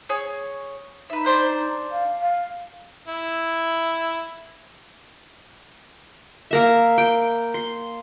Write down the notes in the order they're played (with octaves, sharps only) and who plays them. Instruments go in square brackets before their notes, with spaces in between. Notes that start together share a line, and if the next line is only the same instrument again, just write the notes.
[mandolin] G#4 C#5
[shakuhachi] D#4 [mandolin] B4 E5
[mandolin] D4 C5 G6
[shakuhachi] F5
F5
[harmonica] E4
[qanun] A#3 A#4 E5
G5
C6